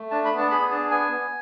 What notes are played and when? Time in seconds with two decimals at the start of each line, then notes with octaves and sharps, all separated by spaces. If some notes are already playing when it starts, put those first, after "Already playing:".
Already playing: A3
0.11 D4 A5
0.25 B5
0.32 B3
0.38 A5
0.51 G#4 B5
0.71 D4 A5
0.90 B3 G#5
1.11 B3